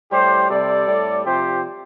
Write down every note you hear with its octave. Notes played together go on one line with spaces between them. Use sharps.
A2 G3 G4 C5
C3 G3 A4 D5
A2 G3
C3 F3 G4 C5